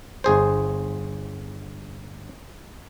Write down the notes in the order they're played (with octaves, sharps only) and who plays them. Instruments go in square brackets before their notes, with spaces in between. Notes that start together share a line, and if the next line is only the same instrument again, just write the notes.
[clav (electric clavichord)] G1 G#4 C5